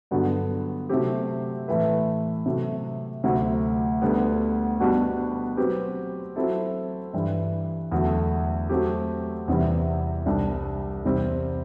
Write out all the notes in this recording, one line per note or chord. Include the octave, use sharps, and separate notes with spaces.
G2 D3 F#3 B3
C3 F#3 A3 C4 G4
A2 E3 A3 E4 B4
C3 F#3 A3
D2 C3 F#3
D2 D3 G3 B3
B2 G3 B3 D4 F#4
F#3 C4 G4 B4
F#3 C4 E4 A4
G2 E3 G3
E2 D3 F#3 A3
F#3 A3 C4 G4
E2 C3 E3 G3
C2 C3 G3 D4
E2 C3 G3 C4